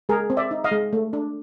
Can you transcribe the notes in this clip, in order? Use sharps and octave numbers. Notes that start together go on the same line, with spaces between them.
G#3 G#4 A#4
C4
D5 E5
D#4
D#5 F5
G#3
A3
D4